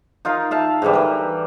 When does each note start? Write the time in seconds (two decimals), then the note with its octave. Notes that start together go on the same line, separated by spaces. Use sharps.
0.25 D#4 F4 A#4 F5
0.51 E5 F5 A5
0.82 G#2 D3 E3 G3
0.93 E3 A#4